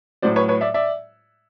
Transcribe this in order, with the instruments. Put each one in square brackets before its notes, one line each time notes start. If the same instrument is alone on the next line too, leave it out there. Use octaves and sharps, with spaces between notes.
[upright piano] A2 F#3 C5 D5
B4 C#5
B4 C#5
D5 E5
D5 E5